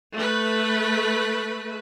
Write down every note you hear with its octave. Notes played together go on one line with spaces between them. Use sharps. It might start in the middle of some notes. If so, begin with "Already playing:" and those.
A3 B4